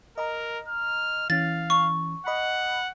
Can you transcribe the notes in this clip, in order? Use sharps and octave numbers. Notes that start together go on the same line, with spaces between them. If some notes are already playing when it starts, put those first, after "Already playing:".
A#4 D#5 A#5
F6
E3 C#4 F5 A6
C#6
D#5 F#5 B5